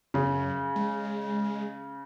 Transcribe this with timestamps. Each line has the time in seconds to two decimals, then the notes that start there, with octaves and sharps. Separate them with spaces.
0.14 F#2 C#3
0.76 G#3